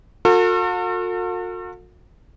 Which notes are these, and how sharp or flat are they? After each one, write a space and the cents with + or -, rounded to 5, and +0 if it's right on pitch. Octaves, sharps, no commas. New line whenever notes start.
F#4 -45 A4 +40